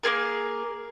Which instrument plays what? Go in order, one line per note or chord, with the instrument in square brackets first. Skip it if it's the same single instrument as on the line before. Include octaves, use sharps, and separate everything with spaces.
[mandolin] A#3 C4 G#4 A#4